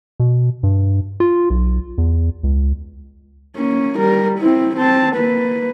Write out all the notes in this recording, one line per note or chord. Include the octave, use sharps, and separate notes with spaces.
B2
G2
F4
B1
E2
C#2
A#3 C#4
G3 A#4
C4 E4
C4 A5
A#3 B4